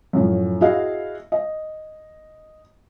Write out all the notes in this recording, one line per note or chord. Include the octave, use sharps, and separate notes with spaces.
F#2 A2 F3
E4 F#4 G#4 D#5 F5
D#5